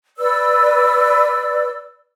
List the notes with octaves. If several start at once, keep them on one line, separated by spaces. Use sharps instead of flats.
B4 D5 E6